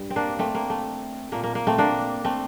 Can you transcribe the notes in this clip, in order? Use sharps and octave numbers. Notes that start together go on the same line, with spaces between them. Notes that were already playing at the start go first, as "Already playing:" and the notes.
Already playing: G2 G3
C4
A#3 D4
A3 C4
A#3
A3
A#2 A3 A#3
A#3
A#3
A3 C4
A#3 D4
A3 C4